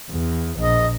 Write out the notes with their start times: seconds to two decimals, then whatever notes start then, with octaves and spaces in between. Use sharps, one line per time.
0.10 E2
0.59 A#1 D#5